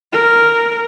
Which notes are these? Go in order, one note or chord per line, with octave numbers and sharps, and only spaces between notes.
A#4